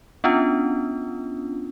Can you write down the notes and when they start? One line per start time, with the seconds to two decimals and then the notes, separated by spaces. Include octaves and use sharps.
0.24 B3 C#4 D4 F4